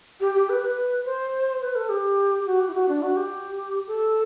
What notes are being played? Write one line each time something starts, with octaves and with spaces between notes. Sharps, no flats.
G4
G4
B4
B4
C5
B4
A4
G4
F#4
G4
E4
F#4
D4
F#4
G4
A4